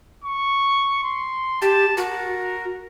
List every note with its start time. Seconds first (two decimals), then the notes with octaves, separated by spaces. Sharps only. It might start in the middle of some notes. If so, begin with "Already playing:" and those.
0.24 C#6
1.04 C6
1.62 G4 A5
1.97 F#4 A#4